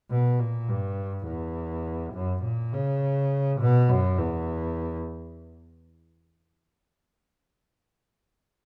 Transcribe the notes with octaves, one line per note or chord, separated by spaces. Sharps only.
B2
A#2
G2
E2
F#2
A#2
C#3
B2
F#2
E2